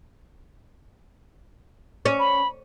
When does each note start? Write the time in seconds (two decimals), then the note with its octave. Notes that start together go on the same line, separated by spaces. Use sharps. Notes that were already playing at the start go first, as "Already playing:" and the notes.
2.05 C#4
2.19 B5